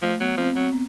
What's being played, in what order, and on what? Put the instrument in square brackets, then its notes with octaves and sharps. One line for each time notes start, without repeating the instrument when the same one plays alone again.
[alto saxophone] F3 [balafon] A3
[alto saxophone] F#3 [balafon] B3
[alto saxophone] F3 [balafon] C4
[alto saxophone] F#3 [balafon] C4
[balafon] B3